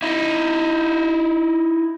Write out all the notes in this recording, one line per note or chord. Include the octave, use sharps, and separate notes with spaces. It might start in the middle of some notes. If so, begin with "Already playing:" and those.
D#4 E4